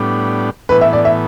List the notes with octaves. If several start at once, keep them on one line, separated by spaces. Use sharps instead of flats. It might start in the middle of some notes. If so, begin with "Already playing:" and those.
Already playing: A2 G3 B3 D4
A2 E3 B3 B4
E5
D5
E5